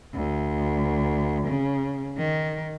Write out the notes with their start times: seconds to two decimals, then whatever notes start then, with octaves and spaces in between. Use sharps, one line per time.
0.14 D2
1.47 C#3
2.18 D#3